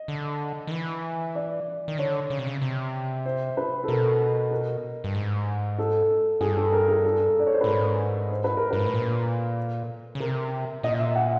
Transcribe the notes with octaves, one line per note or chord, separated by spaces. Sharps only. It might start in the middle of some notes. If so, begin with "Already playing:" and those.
Already playing: D#5
D3
D#3
E3
D5
D#3
D3 C#5
C#3
C3
C#3
C3
C5
B4
A4
B2 A#4
A#4
G2
G#2
A4
G2 G#4
A4
A#4
G#4
A4
D5
C#5
C5
B4
A2
G#2 A#4
C5
B4
A#4
G2 B4
G#2
A2
A#2
C#3
C3 A#4
A#2 D#5
E5
F#5